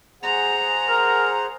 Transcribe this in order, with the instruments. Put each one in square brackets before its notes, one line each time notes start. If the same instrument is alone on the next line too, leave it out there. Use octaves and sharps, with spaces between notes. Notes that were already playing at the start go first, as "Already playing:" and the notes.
[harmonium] G#4 C5 F#5 [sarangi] A#5
[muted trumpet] A#4